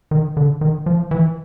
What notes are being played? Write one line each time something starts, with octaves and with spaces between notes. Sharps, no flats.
D#3
D3
D#3
F3
E3